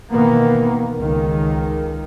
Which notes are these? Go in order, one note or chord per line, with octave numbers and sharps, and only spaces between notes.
B2 D#3 E3 A#3 B3
C#2 D#3